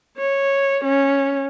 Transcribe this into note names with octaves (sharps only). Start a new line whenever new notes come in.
C#5
C#4